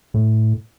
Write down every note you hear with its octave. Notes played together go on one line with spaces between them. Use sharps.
A2